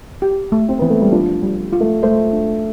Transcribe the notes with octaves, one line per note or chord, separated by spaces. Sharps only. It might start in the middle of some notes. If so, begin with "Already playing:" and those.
G4
A3
C4
E3 B3
A3
G3
F3 D4
G3
F4
A3
A3 C5
D4